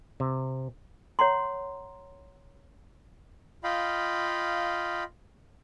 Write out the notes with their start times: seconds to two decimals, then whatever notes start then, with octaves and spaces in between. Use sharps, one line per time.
0.20 C3
1.19 C#5 F#5 A#5 C6
3.64 F4 D#5 F5 G5 B5